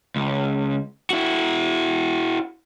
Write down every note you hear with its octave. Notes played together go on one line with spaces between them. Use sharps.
C#2
E4 F#4